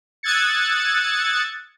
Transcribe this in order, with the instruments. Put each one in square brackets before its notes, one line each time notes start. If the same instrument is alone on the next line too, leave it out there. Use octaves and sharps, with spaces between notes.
[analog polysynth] D#6 E6 F#6 G#6 A6 C#7